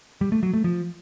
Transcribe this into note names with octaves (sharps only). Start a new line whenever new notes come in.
G3
A3
F#3
A3
F3